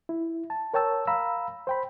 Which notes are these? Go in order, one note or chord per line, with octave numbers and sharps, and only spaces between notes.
E4
A5
A#4 C#5 G5 A5 E6
F5 A#5 B5 E6
C5 G5 B5